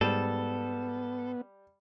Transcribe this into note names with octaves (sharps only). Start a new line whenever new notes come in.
G#2 G3 B3 A4